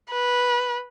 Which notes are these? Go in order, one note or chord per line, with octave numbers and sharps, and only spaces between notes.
B4